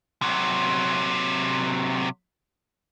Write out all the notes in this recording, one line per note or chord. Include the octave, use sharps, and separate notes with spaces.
C3 F#3